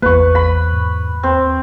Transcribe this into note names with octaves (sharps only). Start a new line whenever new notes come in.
A1 E2 A#3 B4 C#6
B5
G#2
D#2 C4